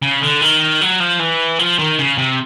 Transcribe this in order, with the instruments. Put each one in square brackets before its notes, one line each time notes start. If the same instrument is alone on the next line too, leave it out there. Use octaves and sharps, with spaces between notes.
[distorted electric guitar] C#3
D3
D#3
F#3
F3
E3
F3
D#3
C#3
C3